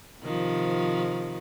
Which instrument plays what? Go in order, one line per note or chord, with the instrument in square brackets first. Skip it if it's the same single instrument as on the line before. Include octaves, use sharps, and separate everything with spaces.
[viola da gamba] C3 D#3 F3